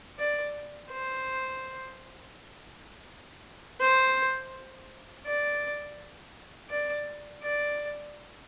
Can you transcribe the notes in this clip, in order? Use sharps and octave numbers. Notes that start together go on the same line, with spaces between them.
D5
C5
C5
D5
D5
D5